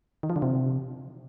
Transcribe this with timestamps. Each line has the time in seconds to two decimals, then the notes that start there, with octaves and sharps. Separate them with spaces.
0.23 D#3
0.30 F3
0.36 D3
0.42 C3